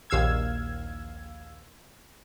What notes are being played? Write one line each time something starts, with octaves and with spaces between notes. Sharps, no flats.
A#1 D#2 F5 E6 G#6